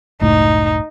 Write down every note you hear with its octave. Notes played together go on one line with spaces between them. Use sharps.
F#1 C#2 A2 D#4